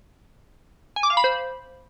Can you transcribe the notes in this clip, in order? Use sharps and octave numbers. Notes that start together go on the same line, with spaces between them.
G#5
D6
F5
B5
C5